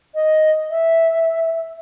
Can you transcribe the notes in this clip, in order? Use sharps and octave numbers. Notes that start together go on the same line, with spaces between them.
D#5
E5